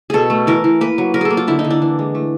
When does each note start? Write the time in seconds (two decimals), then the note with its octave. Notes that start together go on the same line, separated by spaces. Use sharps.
0.10 B2 G#4 A4
0.30 A3
0.47 E3 A#4
0.64 E3
0.81 A#3 B4
0.98 F#3
1.14 F#3 A#4
1.21 G#4 A4
1.30 A#3
1.37 F4
1.47 D3 E4
1.59 D#4
1.64 D3
1.70 D4
1.82 E3
1.99 G#3
2.15 A3